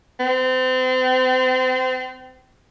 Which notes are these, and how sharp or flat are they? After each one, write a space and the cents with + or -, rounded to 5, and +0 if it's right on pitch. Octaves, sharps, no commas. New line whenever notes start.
C4 -30